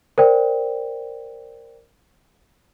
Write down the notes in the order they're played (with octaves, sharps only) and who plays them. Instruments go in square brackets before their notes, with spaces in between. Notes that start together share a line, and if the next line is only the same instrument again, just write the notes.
[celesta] A#4 C5 D5 G5